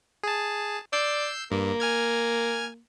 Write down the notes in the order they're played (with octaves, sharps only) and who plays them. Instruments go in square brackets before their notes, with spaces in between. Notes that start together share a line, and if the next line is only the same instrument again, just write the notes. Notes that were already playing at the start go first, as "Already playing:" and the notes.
[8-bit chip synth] G#4 A5
[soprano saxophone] D5 [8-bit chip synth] E6 G6 C7
[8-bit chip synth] G2 [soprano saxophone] A#3
[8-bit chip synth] G#5 F6 G#6